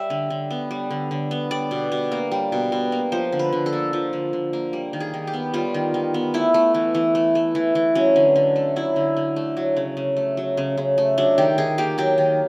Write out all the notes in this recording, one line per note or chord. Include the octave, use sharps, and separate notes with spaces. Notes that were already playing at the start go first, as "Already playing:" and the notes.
Already playing: G3 E5
D3
D3
B3
G3
D3
D3
B3
G3 D5
B2
B2
A#3
G3
B2
B2
A#3
F3 C5
D3
B4
D3
A4
A#3
F3
D3
D3
A#3
G3
D#3
G#4
D#3
G4
B3
G3 F4
D#3
D#3
B3
A3 E4
A3
E3
E3
A3
A3
E3
E3
F#3 C#4
D3
D3
A3
F#3 E4
D3
D3
A3
F#3
C#3
C#3
A3
F#3
C#3
C#3
A3
F#3 D4
D#3 G4
D#3 G#4
A#3 G4
F#3 G4
D#3